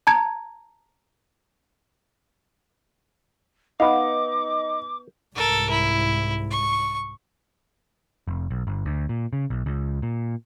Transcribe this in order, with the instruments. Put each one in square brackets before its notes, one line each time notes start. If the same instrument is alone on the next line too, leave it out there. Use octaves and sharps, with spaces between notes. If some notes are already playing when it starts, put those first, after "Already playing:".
[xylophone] A5 A#5 G#6
[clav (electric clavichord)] B3 F5 [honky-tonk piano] D#4 [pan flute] D6
[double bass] C2 G#2 [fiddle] A4 A#4
[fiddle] E4
C#6
[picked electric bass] F1
B1
G1
D2
A#2
C#3
B1
C#2
A#2